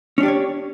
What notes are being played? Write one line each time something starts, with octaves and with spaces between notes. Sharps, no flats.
C#4 D4 G4 C#5 D5